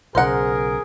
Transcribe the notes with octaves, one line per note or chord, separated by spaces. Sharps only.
B1 C#3 G#4 A#4 C5 F#5